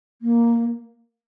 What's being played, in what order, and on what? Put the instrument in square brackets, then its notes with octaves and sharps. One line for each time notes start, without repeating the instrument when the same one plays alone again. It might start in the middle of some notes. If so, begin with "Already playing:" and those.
[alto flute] A#3